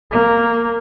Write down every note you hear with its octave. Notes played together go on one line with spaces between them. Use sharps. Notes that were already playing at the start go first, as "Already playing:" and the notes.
A#3